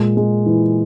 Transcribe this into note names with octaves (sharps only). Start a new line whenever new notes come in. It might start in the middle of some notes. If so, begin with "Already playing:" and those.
Already playing: A#2 G#3
G#3
E3